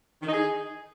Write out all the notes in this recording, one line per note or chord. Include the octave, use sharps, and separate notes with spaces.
D#3
D#4
G#4